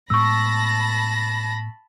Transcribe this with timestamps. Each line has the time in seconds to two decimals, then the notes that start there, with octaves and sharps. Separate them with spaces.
0.10 A2 G#3 B3 A5 B5 C#6 E6 A#6